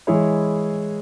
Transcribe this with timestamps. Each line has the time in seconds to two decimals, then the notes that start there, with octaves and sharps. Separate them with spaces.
0.07 E3 G#3 E4 G#4 C#5